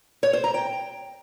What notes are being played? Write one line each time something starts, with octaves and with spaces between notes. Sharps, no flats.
C#5
C5
A#5
G5